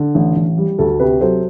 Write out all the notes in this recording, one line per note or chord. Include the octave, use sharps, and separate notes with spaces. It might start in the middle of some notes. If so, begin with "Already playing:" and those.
Already playing: D3
A1
A1
G3
D2 F#4 A4
C3 G4 B4
F#3 A4 C5